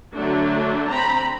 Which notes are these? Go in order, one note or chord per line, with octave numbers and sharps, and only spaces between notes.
D3 F#3 A3 D4
C4 A#5 B5